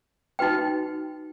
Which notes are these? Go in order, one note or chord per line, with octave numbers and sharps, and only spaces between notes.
D#4 F#4 B4 G5